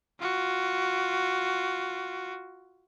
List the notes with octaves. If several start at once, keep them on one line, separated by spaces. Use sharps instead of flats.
F4 F#4